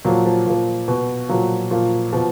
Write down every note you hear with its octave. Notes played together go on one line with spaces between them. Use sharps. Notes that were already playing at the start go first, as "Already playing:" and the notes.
A#2 F3 F#3
F3
A#2 F3
B2
A#2 F3 F#3
A#2 F3
B2 F3